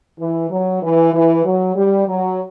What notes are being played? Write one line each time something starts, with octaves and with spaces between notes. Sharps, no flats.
E3
F#3
E3
E3
F#3
G3
F#3